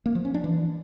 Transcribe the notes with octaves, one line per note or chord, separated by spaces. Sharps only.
A#3
F3
C#4
D4
E3